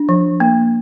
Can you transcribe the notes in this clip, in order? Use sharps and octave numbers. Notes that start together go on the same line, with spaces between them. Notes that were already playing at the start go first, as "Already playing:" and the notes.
Already playing: D4
F3
A#3